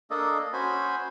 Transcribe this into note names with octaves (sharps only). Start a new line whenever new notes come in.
A#3 D4 A4 D#5
C#4 F#4 C5 G#5 B5